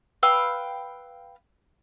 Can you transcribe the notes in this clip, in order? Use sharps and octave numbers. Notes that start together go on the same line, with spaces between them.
B4 F5 G5 E6